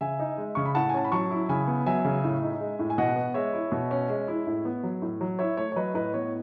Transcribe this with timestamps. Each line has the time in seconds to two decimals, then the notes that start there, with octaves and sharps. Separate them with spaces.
0.01 C#3 E5 G#5
0.19 D#4
0.38 G#3
0.55 C#3 C#6
0.66 B5
0.75 A2 F#5 A5
0.89 G#5
0.94 C#4 A5
1.04 B5
1.12 F#3 A5 C#6
1.31 E4
1.49 C#3 G#5 B5
1.67 B3
1.86 F#3 E5 G#5
2.05 C#3
2.24 A2
2.43 D#4
2.60 G#3
2.79 A2
2.90 G#5
2.98 B2 D#5 F#5
3.16 B3
3.34 G#3 C#5 E5
3.53 E4
3.72 B2
3.91 C#4
4.09 G#3
4.28 E4
4.47 A2
4.65 B3
4.83 F#3
5.02 A2
5.21 F#3
5.39 E4 C#5 E5
5.57 A3 C#5
5.72 C#5
5.76 F#3 B4 D#5
5.94 A2 B4 D#5
6.14 B3 C#5